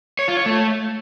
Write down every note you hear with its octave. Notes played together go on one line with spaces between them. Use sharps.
C#5
F4
C#5
A3